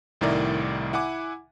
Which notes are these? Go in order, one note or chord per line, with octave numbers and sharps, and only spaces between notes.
C2 A2 D#3 E4 A#4 D5
E4 F#5 G#5 D6